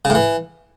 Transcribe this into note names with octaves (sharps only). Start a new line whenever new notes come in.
C#3
A2
E3